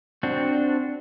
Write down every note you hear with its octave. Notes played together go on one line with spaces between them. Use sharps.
C4 D4 F#4